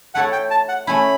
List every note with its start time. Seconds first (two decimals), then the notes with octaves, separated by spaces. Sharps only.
0.15 A3 E4 A4 C#5 F#5
0.32 G5
0.51 A5
0.69 F#5
0.87 A3 C#4 E4 B5